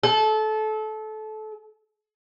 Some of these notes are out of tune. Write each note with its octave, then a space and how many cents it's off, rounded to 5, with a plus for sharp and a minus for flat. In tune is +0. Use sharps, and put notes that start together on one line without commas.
A4 -25